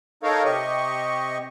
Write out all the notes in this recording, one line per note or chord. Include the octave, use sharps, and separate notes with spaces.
D#4 A4 A#4 C#5 F5
C3 G4 D#5 C#6